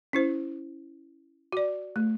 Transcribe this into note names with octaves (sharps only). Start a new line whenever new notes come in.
C#4 E4 C5
F#4 D5
A3